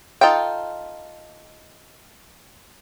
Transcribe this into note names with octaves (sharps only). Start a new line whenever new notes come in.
D#4 F4 A4 G5